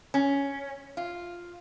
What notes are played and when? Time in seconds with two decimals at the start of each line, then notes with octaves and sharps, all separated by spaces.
0.14 C#4
0.97 F4